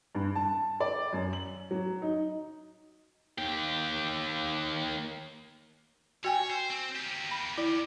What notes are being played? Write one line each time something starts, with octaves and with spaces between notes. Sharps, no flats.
G2
A5
D5
F#2
F#7
F#3
D#4
D#2 G4
F#4 C#5 G5 G#5
C5
C4
A#3 G4
B5
E4 D5